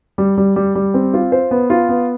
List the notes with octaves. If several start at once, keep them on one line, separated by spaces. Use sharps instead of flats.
G3
G3
G3
G3
C4
F4
C5
B3
F4
B3